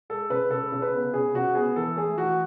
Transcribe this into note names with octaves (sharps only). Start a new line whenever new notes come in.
G#3 A4
C#3 B4
C#3 A4
C#3
B4
B3
C#3 G#4
C#3 F#4
B3 G#4
E3 A4
A3 G#4
E3 F#4